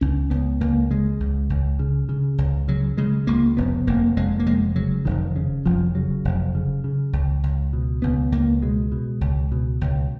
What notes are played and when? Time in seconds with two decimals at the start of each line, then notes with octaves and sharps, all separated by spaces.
0.01 C#2 C#4
0.30 C#2 B3
0.61 C#2 A#3
0.90 C#3 G#3
1.20 C#2
1.50 C#2
1.79 C#3
2.09 C#3
2.38 C#2
2.68 C#3 F#3
2.97 C#3 G#3
3.27 C#2 A#3
3.57 F1 B3
3.87 F1 A#3
4.16 F1 G#3
4.39 A#3
4.46 F1 G#3
4.76 C#3 F#3
5.05 F1 D#3
5.36 C#3
5.66 F1 F3
5.95 C#3 F#3
6.25 F1
6.55 C#3
6.84 C#3
7.13 C#2
7.43 C#2
7.73 B2
8.02 C#2 B3
8.32 C#2 A#3
8.62 B2 G#3
8.92 B2
9.21 C#2
9.52 B2
9.81 C#2